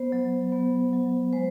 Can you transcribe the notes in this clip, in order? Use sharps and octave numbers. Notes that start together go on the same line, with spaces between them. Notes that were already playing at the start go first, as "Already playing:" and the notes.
Already playing: B3 C5
F#3
B3
F#3
G#3 C5